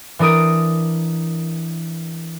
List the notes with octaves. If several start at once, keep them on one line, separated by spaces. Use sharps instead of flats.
E3 D4 A#4 D#6 D7